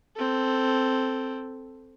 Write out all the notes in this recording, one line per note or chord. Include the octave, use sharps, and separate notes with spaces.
C4 A4